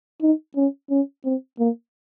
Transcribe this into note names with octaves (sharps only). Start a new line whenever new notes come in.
D#4
C#4
C#4
C4
A#3